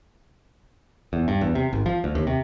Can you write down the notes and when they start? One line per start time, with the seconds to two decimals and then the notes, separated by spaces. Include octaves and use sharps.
1.13 E2
1.28 G2
1.41 E2
1.55 C3
1.73 G#1
1.86 F3
2.04 D2
2.15 D#2
2.27 C3